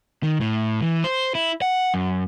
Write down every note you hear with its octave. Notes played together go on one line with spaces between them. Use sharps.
D#3
A2
E3
C5
E4
F#5
F#2